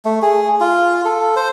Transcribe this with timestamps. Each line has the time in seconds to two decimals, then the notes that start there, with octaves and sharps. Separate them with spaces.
0.05 A3
0.22 G#4
0.60 F4
1.05 A4
1.36 C5